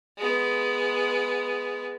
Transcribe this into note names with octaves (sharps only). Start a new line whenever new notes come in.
G#3 B3